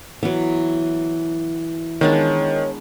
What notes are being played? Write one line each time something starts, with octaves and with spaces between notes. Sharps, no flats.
E3 F#3 B3
D#3 G#3 B3 D4 C#5